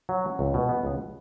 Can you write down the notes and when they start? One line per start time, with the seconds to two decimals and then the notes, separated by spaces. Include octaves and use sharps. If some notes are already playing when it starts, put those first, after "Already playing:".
0.09 F#3
0.24 C#4
0.39 C#2
0.54 B2
0.69 B3
0.83 C#2